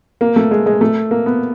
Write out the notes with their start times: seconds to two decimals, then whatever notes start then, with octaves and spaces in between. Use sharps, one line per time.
0.21 A#3
0.36 A3
0.51 G#3
0.66 G#3
0.81 A3
1.11 A#3
1.26 B3